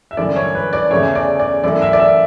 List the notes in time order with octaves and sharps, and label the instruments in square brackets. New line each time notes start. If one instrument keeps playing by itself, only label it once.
[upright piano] E5
G1 F#2 E3 A3 D5
C#5
B4
D5
E2 C#3 E3 A3 C#5
D5
D5
F#2 E3 A3 D5
E5
D5
E5